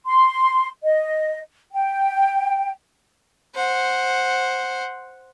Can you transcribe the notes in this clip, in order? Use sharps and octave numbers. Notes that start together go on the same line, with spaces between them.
C6
D#5
G5
C5 F#5